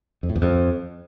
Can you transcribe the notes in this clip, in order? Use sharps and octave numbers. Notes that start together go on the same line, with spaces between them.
F2
A2
E2
F2